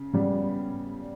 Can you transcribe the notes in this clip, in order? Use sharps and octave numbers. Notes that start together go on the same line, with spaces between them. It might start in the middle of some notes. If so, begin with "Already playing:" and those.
Already playing: C#3
C#3 G3 B3